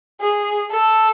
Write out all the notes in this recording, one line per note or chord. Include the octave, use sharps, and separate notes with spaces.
G#4
A4